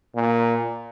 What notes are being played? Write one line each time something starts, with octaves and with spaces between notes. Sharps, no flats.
A#2